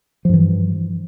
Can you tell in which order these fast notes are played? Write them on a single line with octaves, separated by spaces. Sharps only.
F3 G2 E3